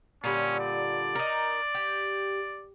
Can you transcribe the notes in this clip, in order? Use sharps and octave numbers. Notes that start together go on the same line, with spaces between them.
A#2 D3 G3 C#4
D5
D#4 A#4
G4